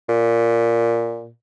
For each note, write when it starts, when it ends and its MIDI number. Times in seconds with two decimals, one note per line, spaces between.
0.09 1.30 46